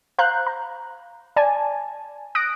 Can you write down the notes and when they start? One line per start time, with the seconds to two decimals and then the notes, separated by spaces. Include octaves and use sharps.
0.18 C5 F5 A#5 F#6 G6
0.47 A#5
1.36 D5 G#5 A5
2.35 D#6 F#6 A#6 D7